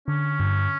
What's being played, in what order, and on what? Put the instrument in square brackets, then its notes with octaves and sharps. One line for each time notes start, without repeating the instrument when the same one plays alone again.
[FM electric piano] D3 [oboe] C#4
[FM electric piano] G2